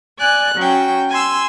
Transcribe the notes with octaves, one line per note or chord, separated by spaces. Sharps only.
D5 G#5 F#6
F#3 C#4 G5
G#5 C6 E6